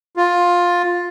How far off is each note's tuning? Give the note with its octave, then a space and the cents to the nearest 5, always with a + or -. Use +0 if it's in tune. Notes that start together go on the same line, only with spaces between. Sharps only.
F4 +10